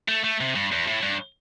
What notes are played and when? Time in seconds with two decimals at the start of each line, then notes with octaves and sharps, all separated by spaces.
0.09 A3
0.24 A3
0.40 C3
0.55 G2
0.72 E2
0.87 A2
1.03 G2